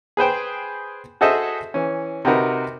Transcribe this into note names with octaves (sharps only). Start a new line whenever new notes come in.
G#4 B4 C5 G5
F#4 G#4 A4 C5 D#5 E5
E3 C#4
C3 C4 D#4 F#4 A#4 B4